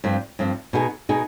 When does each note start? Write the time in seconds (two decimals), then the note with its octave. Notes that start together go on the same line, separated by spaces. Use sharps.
0.04 G2 F3 C4
0.39 G2 F3 C4
0.73 B2 B3 D#4 G#4
1.09 B2 B3 D#4 G#4